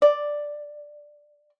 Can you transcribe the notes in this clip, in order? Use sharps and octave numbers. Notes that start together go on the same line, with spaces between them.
D5